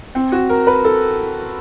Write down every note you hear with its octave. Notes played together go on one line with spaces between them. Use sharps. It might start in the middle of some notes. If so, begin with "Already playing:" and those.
C4
F#4
A#4
B4
A4